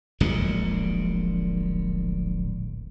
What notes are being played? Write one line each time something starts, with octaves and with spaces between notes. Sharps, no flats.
D1 A#1 A#2 G#3